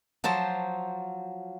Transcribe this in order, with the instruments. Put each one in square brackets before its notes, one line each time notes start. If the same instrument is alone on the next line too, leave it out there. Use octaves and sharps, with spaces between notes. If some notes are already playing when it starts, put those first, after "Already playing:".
[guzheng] F3 F#3 C5 A5